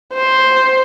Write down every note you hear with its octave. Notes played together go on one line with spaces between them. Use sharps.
C5